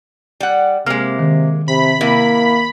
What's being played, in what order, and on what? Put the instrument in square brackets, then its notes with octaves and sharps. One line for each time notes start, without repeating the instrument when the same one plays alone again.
[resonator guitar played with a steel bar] G3 F#5
[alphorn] C3 [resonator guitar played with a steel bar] G#3 A#3 [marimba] F6
[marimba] D#3
[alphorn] C3 [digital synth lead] B5
[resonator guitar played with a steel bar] C3 E4 [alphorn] A#3